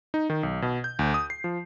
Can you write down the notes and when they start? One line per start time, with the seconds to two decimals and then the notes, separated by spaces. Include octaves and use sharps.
0.14 D#4
0.30 D#3
0.43 B1
0.62 B2
0.84 G6
0.99 D2
1.14 D#6
1.30 C7
1.44 F3